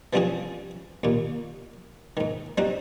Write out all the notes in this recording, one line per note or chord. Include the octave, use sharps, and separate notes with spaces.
E3 F3 G3 C4 C#4 G#4
D#2 A#2
G#2 D#3
G3 C4 D#4 F#4